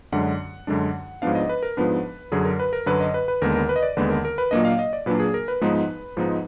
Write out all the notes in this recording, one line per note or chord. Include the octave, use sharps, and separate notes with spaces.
F#2 D3 G#3 D4 F#5
F#2 D3 G#3 D4
G#2 F3 B3 D4 F5
D#5
B4
A#4
G#2 F3 B3 D4 B4
F#2 D3 F#3 G#4
A#4
B4
A#4
F#2 D3 F#3 B4
D#5
B4
B4
D#2 D3 G#3 B3 A#4
A#4
B4
D#5
D5
D#2 D3 G#3 B3 B4
A#4
A#4
B4
A#2 F#3 A#3 D4 D#5
F5
D#5
D5
A#2 F#3 A#3 D4 B4
G#4
A#4
B4
G#2 F3 G#3 B3 D#4
G#2 F3 G#3 B3 D#4